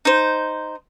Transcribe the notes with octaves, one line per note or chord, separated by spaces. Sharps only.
D#4 C5